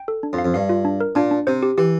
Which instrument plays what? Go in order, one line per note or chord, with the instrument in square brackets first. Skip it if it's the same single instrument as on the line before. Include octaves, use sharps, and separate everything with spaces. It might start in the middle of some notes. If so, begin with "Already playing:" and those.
Already playing: [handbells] G5
A4
D4
[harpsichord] F2
[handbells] F5
[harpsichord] F2
[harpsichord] G2 [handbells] F5
[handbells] F4
D4
A#4
[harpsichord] A#2 [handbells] D4
[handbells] D4
[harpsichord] C3 [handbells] C5
[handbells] G4
[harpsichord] E3 [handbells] G4